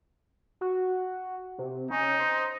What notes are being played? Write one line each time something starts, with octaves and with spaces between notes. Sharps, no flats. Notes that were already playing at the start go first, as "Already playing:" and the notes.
F#4
C3
C#4 D#4
C5